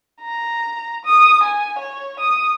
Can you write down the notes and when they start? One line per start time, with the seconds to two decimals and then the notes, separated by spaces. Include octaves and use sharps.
0.22 A#5
1.05 D#6
1.43 G#5
1.78 C#5
2.19 D#6